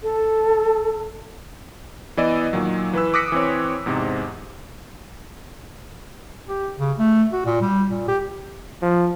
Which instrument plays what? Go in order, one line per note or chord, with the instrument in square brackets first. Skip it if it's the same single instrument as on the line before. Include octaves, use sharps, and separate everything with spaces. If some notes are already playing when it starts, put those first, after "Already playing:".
[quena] A4
[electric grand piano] E3 B3 D5 D#5 E6
A#2 D#3 F#3
E3 B4 E6
D6 D#6 F#6 A#6 B6 C#7
E3 C4 C#5
E2 G#2 C3
[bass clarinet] G4
C#3
A3
F#4
A#2
G3
A#2
G4
[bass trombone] F3